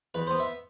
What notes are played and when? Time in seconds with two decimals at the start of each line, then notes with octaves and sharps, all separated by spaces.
0.14 E2 B4
0.27 B3 C5
0.40 E5